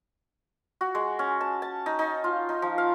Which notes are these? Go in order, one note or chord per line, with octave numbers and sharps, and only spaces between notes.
F#4
G#3
C#4
A5
A5
D#4
D#4
F4
D#4
F3
F5